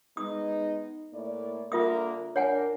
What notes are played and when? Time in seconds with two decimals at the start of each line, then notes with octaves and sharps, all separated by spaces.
0.17 G#3 B3 D#4 D#6
1.12 A2 A#3 D5
1.72 D3 A#3 F4 A#4 E5 D#6
2.36 D4 A#4 C#5 F#5 G#5